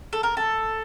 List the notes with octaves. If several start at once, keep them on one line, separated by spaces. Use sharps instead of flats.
A4
A#4
A4